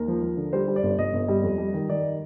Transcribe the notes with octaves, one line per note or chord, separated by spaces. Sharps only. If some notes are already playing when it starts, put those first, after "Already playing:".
Already playing: D#2 A#4
F3
F3
D3
G3 C5
G3
D5
G1
G1 D#5
G1
G3
F2
G3
D#3
D#3 D5